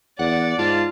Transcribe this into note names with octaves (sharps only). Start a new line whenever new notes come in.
E2 D5 F#5
G#2 F4 A5